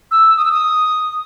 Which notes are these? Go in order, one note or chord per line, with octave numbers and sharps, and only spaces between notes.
E6
D#6
E6
D#6